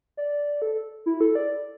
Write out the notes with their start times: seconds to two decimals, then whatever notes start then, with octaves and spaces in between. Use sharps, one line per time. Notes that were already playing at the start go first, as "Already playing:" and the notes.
0.17 D5
0.62 A4
1.06 E4
1.21 A4
1.35 D5